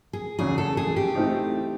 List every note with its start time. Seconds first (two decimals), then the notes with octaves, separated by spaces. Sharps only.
0.13 G#4
0.39 E2 C#3 F#3 G#4
0.58 A4
0.77 G#4
0.96 G4
1.15 E3 A3 C4 D#4